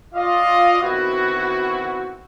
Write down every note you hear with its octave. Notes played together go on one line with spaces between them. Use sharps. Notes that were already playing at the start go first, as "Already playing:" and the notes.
F4 D5 D#5 F5
D#3 B3 C4 E4 F#4